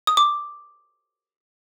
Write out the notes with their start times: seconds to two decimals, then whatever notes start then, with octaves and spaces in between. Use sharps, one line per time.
0.07 D#6
0.17 D6